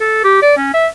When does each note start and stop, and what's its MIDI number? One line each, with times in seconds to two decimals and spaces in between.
0.01 0.22 69
0.24 0.40 67
0.42 0.54 74
0.57 0.74 61
0.74 0.87 76